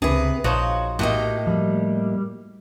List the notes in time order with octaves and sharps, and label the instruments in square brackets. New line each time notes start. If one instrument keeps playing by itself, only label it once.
[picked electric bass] C#2 D4 [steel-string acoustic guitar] C3 B4 [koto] G#4
[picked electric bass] A#1 [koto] F3 D#4 F#4 [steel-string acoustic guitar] C#5
[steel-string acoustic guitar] A2 A#3 D#4 [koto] F#4 D#5 [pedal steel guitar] G4
[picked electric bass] F3 A3 [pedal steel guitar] G3